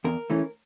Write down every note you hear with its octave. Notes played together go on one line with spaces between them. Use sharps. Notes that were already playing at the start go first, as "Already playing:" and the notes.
E2 A#4
E3 A3 C#4